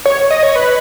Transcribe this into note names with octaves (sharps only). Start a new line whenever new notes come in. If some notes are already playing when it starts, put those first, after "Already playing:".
C#5
D#5
C#5
B4